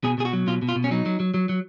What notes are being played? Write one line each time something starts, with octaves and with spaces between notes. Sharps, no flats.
B2 G#4
B2 G#4
F#4
F#3
B2 F4
B2
F4
B2
C#4
F#3 D#4
F#3
F#3
F#3
F#3